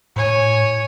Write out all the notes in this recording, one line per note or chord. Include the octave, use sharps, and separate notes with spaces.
A2 C#5 G#5